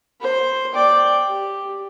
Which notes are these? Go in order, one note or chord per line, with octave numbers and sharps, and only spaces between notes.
C5
D5 G5
G4